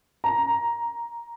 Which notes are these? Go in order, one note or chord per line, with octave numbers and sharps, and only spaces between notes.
A#5